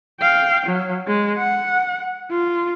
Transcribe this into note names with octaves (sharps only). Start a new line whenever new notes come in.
F5 G5
F#3
G#3
F#5
F4